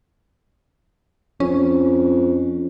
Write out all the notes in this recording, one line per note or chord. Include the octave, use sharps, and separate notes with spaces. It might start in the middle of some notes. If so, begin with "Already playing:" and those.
F2 C#4